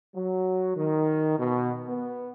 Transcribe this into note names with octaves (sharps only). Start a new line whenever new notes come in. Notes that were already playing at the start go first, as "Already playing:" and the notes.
F#3
D#3
B2
B3